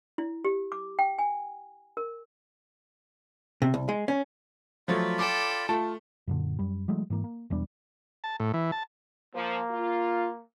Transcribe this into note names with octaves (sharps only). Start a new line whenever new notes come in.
E4
G4
D6
G5
G#5
A#4
C3
C2
G#3
C#4
F3 F#3 A3 F4 D5 B5
A4 G5 D6
A3 F4 A5
F#2 A#2 D3
F#2 G3
E3 F#3 G#3 A3
G#2 E3 A#3
A#3
E1 E2 G3 D4
A5
A2
E3
A5
F3 A#3
F4